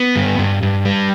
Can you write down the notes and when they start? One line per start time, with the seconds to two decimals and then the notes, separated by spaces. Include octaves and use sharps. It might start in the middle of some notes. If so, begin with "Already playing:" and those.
Already playing: B3
0.16 G2
0.39 G2
0.63 G2
0.85 G3